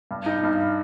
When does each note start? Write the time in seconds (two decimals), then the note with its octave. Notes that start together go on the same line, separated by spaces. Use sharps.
0.11 G2
0.26 D#4
0.43 G2